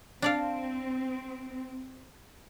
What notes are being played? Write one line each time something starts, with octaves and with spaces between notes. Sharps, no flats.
C4 D4 D5 F5